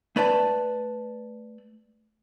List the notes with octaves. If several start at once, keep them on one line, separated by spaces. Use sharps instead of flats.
A3 B4 D5 A5